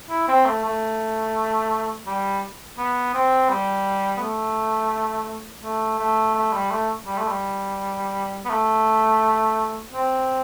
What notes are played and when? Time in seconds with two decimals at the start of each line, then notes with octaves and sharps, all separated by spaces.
0.10 E4
0.28 C4
0.45 A3
0.64 A3
2.07 G3
2.78 B3
3.14 C4
3.49 G3
4.17 B3
4.20 A3
5.64 A3
5.99 A3
6.35 A3
6.53 G3
6.71 A3
7.06 G3
7.18 A3
7.28 G3
8.45 B3
8.50 A3
9.93 C4